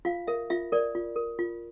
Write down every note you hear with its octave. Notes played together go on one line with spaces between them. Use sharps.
F4 F5
A#4 E5
F4 E5
A#4 D5
F4
A#4
F4